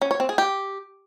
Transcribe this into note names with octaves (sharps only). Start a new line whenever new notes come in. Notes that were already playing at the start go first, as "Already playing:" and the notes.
C#4
C#5
C4
G#4
G4